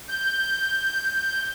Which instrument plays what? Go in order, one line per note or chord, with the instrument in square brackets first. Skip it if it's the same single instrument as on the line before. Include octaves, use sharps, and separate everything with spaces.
[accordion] G6